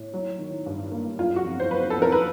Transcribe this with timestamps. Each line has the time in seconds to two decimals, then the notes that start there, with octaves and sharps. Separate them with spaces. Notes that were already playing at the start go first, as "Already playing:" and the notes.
Already playing: A2
0.14 F#3
0.39 D#3
0.66 G2
0.92 A#3
1.18 F#1 F4
1.36 F#4
1.44 F2
1.60 C5
1.71 F#1 B4
1.90 A4
1.98 F2 A#4
2.12 B4